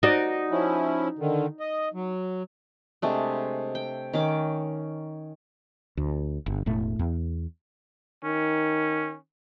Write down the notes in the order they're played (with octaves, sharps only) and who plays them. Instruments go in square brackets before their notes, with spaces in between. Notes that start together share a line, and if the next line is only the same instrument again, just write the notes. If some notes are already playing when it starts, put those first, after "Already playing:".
[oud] D#4 F#4 D5
[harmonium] F3 C#4 E4
D3 D#3
D#5
F#3
[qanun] C3 G#3 A3 D4
G5
D#3 C#4 D6
[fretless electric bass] D2
G1
E1 A2 A3
E2
[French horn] D#3 [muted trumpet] C#4